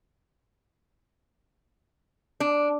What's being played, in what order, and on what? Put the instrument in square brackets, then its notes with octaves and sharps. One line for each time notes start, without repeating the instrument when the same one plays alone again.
[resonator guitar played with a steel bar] D4